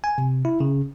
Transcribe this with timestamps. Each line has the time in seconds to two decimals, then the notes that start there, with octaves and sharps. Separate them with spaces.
0.04 G#5
0.18 C3
0.45 E4
0.60 C#3